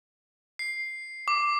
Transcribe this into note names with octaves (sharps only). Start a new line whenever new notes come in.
C7
D6